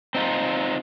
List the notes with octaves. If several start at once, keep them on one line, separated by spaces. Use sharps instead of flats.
C4 D#4 F4